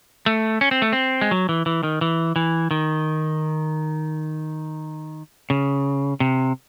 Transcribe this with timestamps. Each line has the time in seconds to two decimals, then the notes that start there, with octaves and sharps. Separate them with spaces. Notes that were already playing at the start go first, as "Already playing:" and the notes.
0.26 A3
0.61 C#4
0.71 C4
0.82 A3
0.93 C4
1.21 G#3
1.31 F#3
1.49 E3
1.66 E3
1.83 D#3
2.01 E3
2.36 E3
2.71 D#3
5.50 C#3
6.20 C3